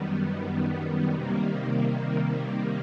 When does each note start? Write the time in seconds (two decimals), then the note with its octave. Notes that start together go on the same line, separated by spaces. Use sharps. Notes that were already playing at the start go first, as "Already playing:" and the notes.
Already playing: F#2 D#3 G3 B3
1.15 C3 D#3 G3 A#3